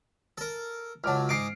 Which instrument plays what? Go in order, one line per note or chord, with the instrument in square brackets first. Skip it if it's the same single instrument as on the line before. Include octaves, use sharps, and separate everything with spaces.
[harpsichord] A4 A#4
[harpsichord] C#2 F#3 [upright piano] A5 D6 F6
[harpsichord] G#2 D#5 D6 [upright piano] C7 D7